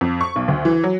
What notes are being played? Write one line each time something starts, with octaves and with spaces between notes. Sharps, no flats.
F2
C#6
B1
D2
E3
F#3